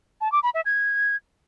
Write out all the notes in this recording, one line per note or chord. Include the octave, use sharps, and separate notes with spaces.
A5
D6
B5
E5
G#6